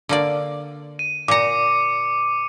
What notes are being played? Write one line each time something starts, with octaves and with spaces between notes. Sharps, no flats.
D3 A#3 D5
D#7
A#2 A#5 D6 C#7